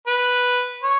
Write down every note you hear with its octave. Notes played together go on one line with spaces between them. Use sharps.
B4
C#5